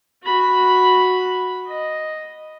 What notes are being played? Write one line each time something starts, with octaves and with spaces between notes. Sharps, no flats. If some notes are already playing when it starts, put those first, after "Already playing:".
F#4 B5
D#5